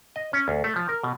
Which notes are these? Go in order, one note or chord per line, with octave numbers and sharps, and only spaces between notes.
D#5
C#4
D2
A3
F3
A#4
B2